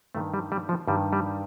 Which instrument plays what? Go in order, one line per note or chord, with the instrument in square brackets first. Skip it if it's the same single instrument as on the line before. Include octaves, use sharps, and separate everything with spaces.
[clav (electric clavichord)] G2 D#3 A3
G3
G3
F3
G2 D#3 G3
G3